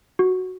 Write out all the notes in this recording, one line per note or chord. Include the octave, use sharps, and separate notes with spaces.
F#4